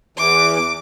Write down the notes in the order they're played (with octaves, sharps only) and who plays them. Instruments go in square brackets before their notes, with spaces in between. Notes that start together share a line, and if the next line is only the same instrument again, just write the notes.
[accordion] E2 E3 [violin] D6